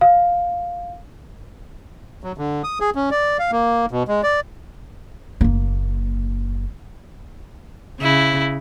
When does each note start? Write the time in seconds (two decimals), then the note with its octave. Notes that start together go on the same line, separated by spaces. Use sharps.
0.01 F5
2.24 F#3
2.38 D3
2.64 D#6
2.80 G#4
2.95 C#4
3.11 D5
3.39 F5
3.52 A#3
3.91 B2
4.08 G#3
4.23 D5
5.41 F#1 A#3
8.01 C#3 E4